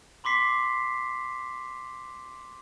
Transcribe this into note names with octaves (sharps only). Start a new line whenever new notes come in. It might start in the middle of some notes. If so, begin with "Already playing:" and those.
B5 C6 D6 B6 C7